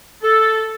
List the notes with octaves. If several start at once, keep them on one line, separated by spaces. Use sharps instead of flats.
A4